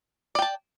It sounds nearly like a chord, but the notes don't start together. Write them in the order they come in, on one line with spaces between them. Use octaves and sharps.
D5 G5 A5